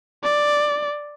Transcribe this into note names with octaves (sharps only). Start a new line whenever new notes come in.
D5